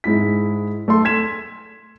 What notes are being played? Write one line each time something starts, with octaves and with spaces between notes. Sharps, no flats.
G#2 G#3 E4 B6
A3 A4 C6
G#6 B6 E7